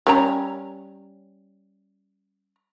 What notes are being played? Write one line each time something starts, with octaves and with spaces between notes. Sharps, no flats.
G3 C#4 A#5